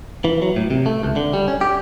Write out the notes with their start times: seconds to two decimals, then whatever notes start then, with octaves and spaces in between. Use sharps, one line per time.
0.25 E3
0.42 F#3
0.56 A2
0.70 C3
0.86 A3
1.03 C#2
1.16 D3
1.33 G3
1.48 C#4
1.61 G4